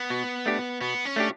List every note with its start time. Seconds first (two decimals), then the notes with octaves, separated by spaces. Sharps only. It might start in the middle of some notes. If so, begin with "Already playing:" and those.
Already playing: B3
0.10 B2
0.46 A3 D4 G4
0.81 B2 B3
1.05 C#4
1.16 A3 D4 G4